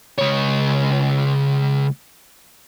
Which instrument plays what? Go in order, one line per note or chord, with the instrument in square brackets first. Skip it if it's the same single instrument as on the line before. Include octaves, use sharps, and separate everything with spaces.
[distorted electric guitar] C#2 C#5